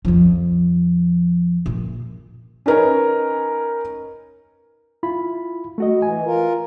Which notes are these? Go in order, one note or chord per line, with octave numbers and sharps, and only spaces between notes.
F2 F3
A#2
C#4 D#4 A#4 B4 C#5
E4 F4 B5
A3 F#4 D#5
E3 G#5
F4 A#4